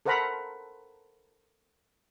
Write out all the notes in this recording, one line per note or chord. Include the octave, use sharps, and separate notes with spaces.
A4 A#4 C5 F#5 A#5 B5